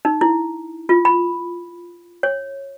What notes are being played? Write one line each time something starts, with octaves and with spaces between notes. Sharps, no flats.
D#4
E4
F4
B5
C#5